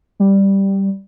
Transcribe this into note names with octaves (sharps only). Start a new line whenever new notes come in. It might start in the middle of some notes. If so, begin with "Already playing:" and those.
G3